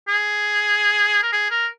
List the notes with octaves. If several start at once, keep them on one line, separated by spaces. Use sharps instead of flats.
G#4
A#4
G#4
A#4